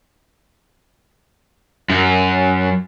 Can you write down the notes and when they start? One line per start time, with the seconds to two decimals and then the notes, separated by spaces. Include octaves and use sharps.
1.90 F#2